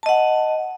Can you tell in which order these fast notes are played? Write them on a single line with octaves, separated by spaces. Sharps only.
A5 D#5 F#5